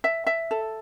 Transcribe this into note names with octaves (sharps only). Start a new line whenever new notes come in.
E5
E5
A4